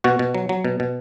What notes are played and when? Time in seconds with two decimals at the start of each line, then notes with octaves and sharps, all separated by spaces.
0.04 B2 F#4
0.19 B2
0.35 F#3
0.49 F#3
0.65 B2
0.80 B2